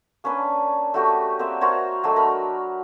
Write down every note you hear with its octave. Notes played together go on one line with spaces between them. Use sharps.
A#3 C#4 D4 B4
A3 F#4 G4 B4
A#3 C4 D5 E5
F#4 A#4 C5 C#5
F#3 G#3 A3 D4
A#4 B5